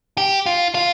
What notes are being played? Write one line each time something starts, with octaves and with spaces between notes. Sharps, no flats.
G4
F4
F4